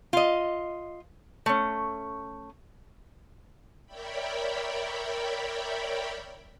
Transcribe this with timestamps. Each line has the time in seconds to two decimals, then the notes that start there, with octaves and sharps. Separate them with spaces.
0.13 F4 D#5
1.46 A3 C#4
3.86 A#4 C#5 D5 E5 G5 B5